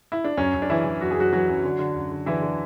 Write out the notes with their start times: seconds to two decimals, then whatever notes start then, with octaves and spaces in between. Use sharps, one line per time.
0.12 E4
0.24 D4
0.37 F#2 C#4
0.54 F#2
0.62 D4
0.70 E3 E4
0.85 E3
1.01 F#2 F#4
1.11 G#4
1.17 F#2 F#3 F#4
1.32 E3 F#3 F#4
1.48 F#2
1.64 D3
1.79 D3
1.96 F#2
2.12 D3
2.26 D3 E3 E4
2.42 D3